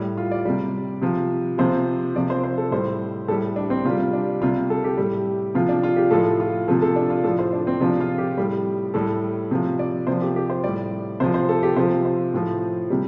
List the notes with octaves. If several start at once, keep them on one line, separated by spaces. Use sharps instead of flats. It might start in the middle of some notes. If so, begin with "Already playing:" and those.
Already playing: A2 G3
F4
D5
C3 G3
C3 F3
C3 F3 C5
C3 F3 D5
C5
C5
A4
A2 G3 C5
A2 G3 A4
D4
C4
C3 F4
G3
D4
C3 G3 F4
A4
G4
A2 G3
C3 F3 F4
D4
F4
G4
A2 F3 A4
F4
C3 F3 A4
A4
D4
F4
A2 F3 A4
C5
D4
C4
C3 F3 D4
F4
G4
A2 G3
A2 G3 A4
C3 F3
D5
C3 F3 C5
G4
G4
C5
A2 G3 D5
C3 F3 C5
C5
A4
G4
C3 F3 C5
C5
A2 F3
C3 G3